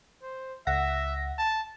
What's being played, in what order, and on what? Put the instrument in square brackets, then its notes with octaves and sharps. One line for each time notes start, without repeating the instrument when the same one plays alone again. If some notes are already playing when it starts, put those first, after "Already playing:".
[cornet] C5
[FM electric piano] C#2 F#5 A#6 [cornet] E5
[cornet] A5